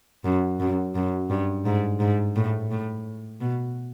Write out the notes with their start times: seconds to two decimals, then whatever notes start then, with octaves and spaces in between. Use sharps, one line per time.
0.25 F#2
0.60 F#2
0.95 F#2
1.30 G2
1.66 G#2
2.00 G#2
2.36 A2
2.71 A2
3.41 B2